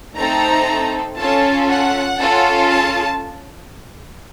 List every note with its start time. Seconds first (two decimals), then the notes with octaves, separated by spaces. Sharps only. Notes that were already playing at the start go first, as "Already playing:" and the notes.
0.16 A3 C4 D#4 A4 A#5
1.17 C#4 F4 A4 A5
1.68 F#5
2.19 C#4 F4 A4
2.70 A5